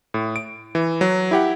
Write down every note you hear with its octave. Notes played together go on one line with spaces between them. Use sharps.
A2
D7
E3
F#3
E4 G4 F#5